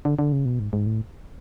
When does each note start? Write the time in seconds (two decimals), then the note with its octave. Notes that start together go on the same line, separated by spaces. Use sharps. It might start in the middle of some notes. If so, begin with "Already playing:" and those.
0.05 D3
0.19 D3
0.32 C#3
0.45 B2
0.59 G#2
0.73 G#2
0.86 A2